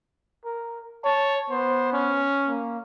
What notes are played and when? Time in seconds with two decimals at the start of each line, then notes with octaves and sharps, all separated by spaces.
0.45 A#4
1.04 C#5 A5
1.50 B3 C5
1.93 C#4
2.47 A#3